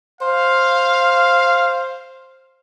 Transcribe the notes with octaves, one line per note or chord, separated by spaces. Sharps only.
C5 F5